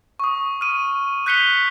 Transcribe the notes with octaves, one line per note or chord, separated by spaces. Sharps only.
C#6 D#6
F6 D#7
F#6 G6 B6 C#7 F7 G7